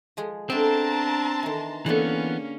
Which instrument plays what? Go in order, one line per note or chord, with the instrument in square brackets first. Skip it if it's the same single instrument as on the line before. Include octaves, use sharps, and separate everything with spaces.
[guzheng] F3 G#3 G#4
[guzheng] B3 E4 A4 [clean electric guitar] C4 [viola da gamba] D4 [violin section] A5 A#5 C6
[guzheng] D#3 E3
[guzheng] D3 G#4 A4 [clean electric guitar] E3 B3 [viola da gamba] A#3 C#4